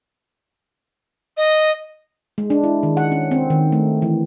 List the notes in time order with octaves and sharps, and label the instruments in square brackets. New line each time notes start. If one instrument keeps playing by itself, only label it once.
[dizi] D#5
[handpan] G#3
D4
E4
D#3
F#5
C#4
C4
D#3
A3
E3